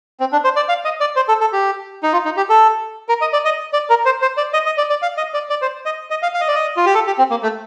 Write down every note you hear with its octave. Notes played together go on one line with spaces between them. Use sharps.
C4
D4
C5
D5
F5
D#5
D5
C5
A4
A4
G4
D#4
F4
D#4
G4
A4
A#4
D#5
D5
D#5
D5
A#4
C5
C5
D5
D#5
D#5
D5
D5
F5
D#5
D5
D5
C5
D#5
D#5
F5
F5
D#5
D5
D#5
F4
G4
A4
G4
C4
A#3
A3